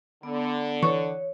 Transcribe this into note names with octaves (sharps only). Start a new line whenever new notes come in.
D3 B3
E3 C#5 C#6 D#6 F#6